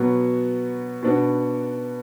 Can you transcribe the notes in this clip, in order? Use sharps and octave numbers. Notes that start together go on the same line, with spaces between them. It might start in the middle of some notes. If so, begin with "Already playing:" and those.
Already playing: B2 F#3 B3 F#4
B2 B3 D4 F#4